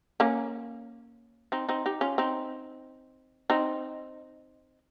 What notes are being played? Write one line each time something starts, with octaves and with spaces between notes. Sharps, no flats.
A#3 C#4
C4 D#4
C4 D#4
D#4 G4
C#4 F4
C4 D#4
C4 D#4